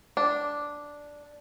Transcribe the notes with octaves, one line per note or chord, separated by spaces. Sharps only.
D4